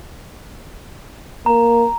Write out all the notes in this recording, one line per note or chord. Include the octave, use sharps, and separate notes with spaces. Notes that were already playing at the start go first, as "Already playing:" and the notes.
A#3 A#5